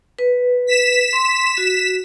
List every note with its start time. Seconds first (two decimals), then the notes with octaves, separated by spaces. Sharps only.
0.19 B4
0.67 B6 E7
1.13 C6
1.58 F#4